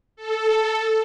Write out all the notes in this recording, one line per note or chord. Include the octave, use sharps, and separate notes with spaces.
A4